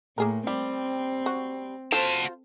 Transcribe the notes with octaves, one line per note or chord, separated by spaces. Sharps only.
A2 A#3 G#4 A#4
G3 C4
F#4
F4 F#4 A4 C5 A5